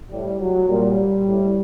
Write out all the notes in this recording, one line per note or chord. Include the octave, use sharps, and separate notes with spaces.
A2 G3
F#3
A#2 G3
A2